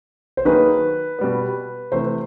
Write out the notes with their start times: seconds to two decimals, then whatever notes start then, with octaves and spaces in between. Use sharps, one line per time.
0.37 C5
0.45 D#3 F#3 A#3 D#4 G#4 B4
1.19 B2 G3 B3
1.92 C3 E3 A3 C5